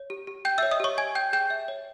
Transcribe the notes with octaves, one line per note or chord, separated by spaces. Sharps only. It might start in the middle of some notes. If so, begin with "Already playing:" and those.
Already playing: C#5
G4
G4
G5 G6
E5 E6
C#5
D#5 D#6
G4 C#5 C#6
C#5 G#5 G#6
G5 G6
G#4 G5 G6
E5
C#5